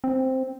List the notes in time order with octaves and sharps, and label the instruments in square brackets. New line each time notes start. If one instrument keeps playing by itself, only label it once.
[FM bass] C4